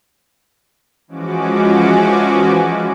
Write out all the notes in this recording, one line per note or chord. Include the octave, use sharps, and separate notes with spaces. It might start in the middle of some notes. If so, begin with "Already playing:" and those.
E3 F3 G#3 C#4 F#4 D6